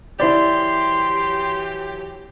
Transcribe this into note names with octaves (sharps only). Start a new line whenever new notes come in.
E3 F#3 E4 G4 C5 D5 C6